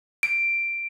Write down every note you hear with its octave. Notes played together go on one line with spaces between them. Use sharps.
D7